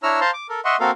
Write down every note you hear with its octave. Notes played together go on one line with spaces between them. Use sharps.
D4 E4 C#5 A#5 E6 F6
C5 F5 A5 A#5 C6
D6
A4 A#4
D#5 E5 F#5 C6 C#6
A#3 C4 F#4 A4 A#4 F5